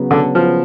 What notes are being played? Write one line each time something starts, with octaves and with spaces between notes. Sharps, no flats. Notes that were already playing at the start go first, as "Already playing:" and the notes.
Already playing: C#3 F#3 B3
D3
F3